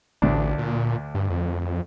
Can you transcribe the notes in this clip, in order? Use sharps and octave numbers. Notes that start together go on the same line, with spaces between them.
A1 D2 D4
A#2
G2
F2